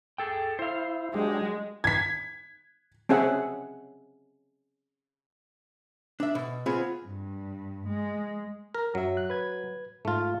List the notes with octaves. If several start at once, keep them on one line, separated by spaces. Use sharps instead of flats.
G#4 A4 G5
E4 C5 F5
F#3 G#3 D4 G4
G#6 B6
C4 C#4 G#4 E5 F#5
D4 E5
B2
B3 C4 F4 G#4
G2
G#3
A#4
F#2 F#3 F#4 E5
F#6
B4 G#6
G#2 A3 F4